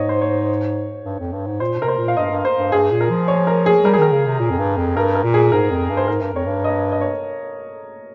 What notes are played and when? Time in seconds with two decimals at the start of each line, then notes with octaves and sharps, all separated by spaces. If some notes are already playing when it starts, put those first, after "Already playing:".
Already playing: G#2 C#5 D#5
0.09 C5
0.21 C#5
1.04 G2
1.19 F2
1.33 G2
1.47 G#2
1.60 A#2 C5
1.80 C3 A#4
1.88 C5
1.98 A#2
2.08 F5
2.17 G2 D#5
2.31 G2
2.45 C5
2.58 G2
2.72 G2 G#4
2.91 A#2
3.01 A#4
3.10 F3
3.28 C#5
3.47 A#4
3.66 G#4
3.84 G3 A#4
3.93 G#4
3.98 D#3 A#4
4.12 C#3
4.26 C3
4.40 A#2
4.51 F2
4.59 G2
4.77 F2
4.96 G2 A#4
5.15 A#4
5.24 A#2
5.34 G#4
5.52 G#2 A#4
5.71 F2
5.90 G2
5.97 C5
6.08 G#2 A#4
6.21 G2
6.34 F2 C#5
6.46 G2
6.64 D#5
6.92 D#5
7.01 C#5